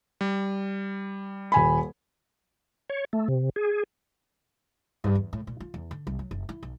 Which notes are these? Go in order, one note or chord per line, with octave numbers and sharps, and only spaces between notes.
G3
D#1 G#5 B5
C#5
A3
C3
G#4
G2
E2
A2
A#2
F4
E2
D3
C2
F#3
F#1
E4
B1